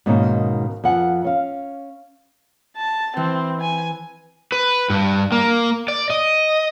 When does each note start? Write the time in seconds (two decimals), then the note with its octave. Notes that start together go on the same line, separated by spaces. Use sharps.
0.06 G#2 B2 D#3 A#3 C#4 D#4
0.84 F2 B3 F#5 G#5
1.24 C#4 F5
2.77 A5
3.17 E3 C4
3.61 G#5
4.52 B4
4.90 G2
5.32 A#3
5.88 D5
6.10 D#5